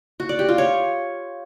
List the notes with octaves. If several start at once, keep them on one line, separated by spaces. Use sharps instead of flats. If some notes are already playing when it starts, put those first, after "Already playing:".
F#4
D5
G4
F4
C#5